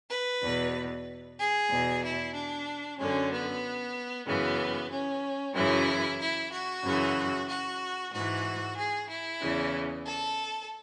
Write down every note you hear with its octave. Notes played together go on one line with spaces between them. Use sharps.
B4
E2 B2
G#4
E2 B2
E4
D4
F#2 D3 C#4
B3
F#2 C#3 E3 B3
C#4
F#2 C#3 E3 E4
E4
F#4
F#2 C#3 E3
F#4
G#2 E3 F#4
G#4
E4
E2 C#3 E3
A4